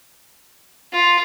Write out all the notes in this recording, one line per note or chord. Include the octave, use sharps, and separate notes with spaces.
F4